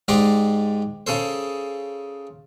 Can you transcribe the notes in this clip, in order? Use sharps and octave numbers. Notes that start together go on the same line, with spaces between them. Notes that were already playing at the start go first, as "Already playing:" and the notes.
G#2 G#3 G4 D5 A#5 C6
C#3 G#4 A4 C5